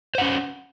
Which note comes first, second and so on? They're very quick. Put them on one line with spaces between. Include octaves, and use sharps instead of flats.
C5 F#5 C#4